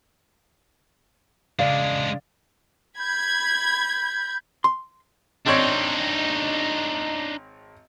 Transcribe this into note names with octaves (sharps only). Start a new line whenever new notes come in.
C#3 G#3 D4 D5 F5
B5 G6 G#6
C6
G#1 C4 D4 D#4 C#5